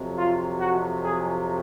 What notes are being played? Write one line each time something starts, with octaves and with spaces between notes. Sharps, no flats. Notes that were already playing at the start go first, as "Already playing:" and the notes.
Already playing: F2 C3 F#3
F4
F#4
G#4